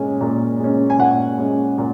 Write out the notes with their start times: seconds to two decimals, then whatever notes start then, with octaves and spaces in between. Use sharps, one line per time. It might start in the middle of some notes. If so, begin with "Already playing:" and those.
Already playing: A#2 G#3 C#4 G#5
0.21 A#2
0.60 G#3 C#4
0.90 G#5
0.99 A#2 F#5
1.38 G#3 C#4
1.78 A#2